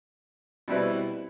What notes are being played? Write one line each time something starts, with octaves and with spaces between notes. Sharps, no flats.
B2 G3 C4 E4 B4